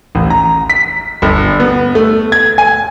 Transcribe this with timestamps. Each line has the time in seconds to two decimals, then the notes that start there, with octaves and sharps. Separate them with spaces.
0.15 A1
0.30 A#5
0.70 B6
1.22 G1
1.60 B3
1.95 A3
2.32 G#6
2.58 G#5